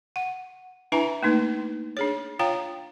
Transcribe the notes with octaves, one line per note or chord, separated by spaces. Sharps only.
F#5
D4 E4 B4 E5 G#5 A#5
A3 A#3 D#4 B4
D4 G#4 C#5
F4 C#5 F5 G5 A#5